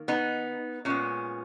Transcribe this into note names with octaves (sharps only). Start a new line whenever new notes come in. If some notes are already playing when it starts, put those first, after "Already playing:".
Already playing: D#3 A#3
B3 D#4
A#2 G#3 B3 C#4